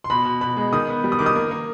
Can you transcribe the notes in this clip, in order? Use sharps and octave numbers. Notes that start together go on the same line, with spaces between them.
C6
B2 B5
B2
B2 B5
G#3
D#3 D#6
B3
G3
D#6
D#3 D6
D#6
A#3
A#3